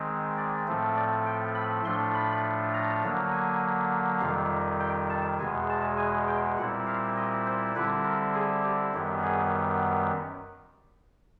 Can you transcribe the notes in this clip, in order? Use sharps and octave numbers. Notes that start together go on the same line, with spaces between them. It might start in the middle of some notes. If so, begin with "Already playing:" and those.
Already playing: D#3 G#3 C4
D5
A2 F3 A3 C4
D5
G5
B5
A2 F3 A3 D4 C6
B5
A#5
D3 F#3 A#3
G#5
F2 C3 D#3 G3 F5
G5
A5
E2 B2 G#3 G#5
A5
G#5
G5
A#2 G3 C4 E4 F#5
F5
D#5
C5
D3 G3 C4 E4 B4
A#4
G#4
G4
F#2 D#3 G3 B3 G4
G#4